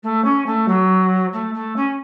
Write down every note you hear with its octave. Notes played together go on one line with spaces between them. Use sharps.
A3
C#4
A3
F#3
A3
A3
C#4